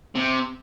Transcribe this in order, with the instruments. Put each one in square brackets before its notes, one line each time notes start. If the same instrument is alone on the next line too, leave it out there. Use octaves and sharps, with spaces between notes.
[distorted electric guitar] C3